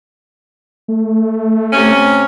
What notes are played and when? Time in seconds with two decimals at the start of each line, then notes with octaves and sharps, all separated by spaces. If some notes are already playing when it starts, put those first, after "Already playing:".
0.88 A3
1.73 C3 C#4